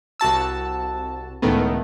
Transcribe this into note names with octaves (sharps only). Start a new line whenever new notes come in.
C2 F#4 A5 E6
C#2 A2 D#3 A3 B3